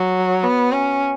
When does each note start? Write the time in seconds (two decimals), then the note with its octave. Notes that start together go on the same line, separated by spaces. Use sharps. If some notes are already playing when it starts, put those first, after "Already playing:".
Already playing: F#3
0.44 B3
0.72 C#4